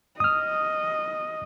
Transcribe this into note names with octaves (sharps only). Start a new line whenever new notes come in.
D#5 D#6 F6